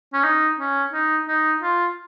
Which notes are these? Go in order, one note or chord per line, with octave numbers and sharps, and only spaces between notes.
C#4
D#4
C#4
D#4
D#4
F4